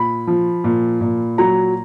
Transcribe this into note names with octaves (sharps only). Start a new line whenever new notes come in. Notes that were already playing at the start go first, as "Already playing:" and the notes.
Already playing: A#2 B5
F3
A#2
A#2
F#3 A#5